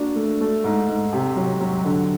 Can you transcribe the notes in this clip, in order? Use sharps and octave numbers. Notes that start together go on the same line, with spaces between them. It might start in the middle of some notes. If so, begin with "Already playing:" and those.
Already playing: A#3 D4 F#4
A3
A3
G#2
G#2
C3
F#3
F#3
D3